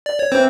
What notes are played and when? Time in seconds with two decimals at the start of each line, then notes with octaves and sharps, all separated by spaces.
0.06 D5
0.19 C#5
0.32 E3 C4 C5